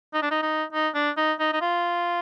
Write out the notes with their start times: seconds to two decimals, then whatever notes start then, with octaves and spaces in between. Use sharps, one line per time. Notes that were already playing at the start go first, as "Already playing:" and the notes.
0.14 D#4
0.22 D4
0.31 D#4
0.43 D#4
0.73 D#4
0.95 D4
1.17 D#4
1.40 D#4
1.53 D#4
1.61 F4